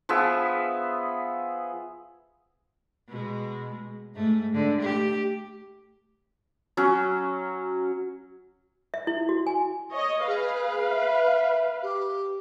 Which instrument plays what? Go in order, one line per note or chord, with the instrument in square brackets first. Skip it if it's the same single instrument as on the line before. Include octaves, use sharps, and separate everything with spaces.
[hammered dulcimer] F3 B3 G#4 E5
[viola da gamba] B2 G#3
G#2 A3
G#2 D3
A3 G4
[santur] F#3 C#4
[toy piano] E5
E4
F#4
G#5
[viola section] C#5 D#5
[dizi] G#4 [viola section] B4 F5
[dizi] E5
G4